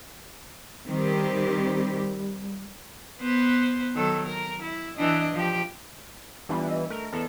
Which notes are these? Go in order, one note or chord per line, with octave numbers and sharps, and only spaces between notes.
D#3 G3 C4 G4
B3 B4 C5
D#3 F#3 A4
A#4
E4
E3 D4 D#5
F3 G4
E3 G3 B3 D4 F4
D#5 E5
A3 A#4
E2 B3 A4